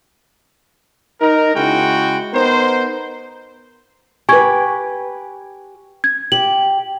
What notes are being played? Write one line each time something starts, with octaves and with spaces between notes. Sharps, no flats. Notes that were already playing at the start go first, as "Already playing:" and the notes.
D#4 A#4
C#3 G#3 E4 F#4 G5
B3 D#4 A#4 C5
G4 B4 G#5 C#6 G#6
G#6
G4 F#7